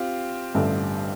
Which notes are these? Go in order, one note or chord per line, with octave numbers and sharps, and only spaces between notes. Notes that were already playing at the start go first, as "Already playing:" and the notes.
Already playing: C4 F4 G4
A1 G2 D3 A3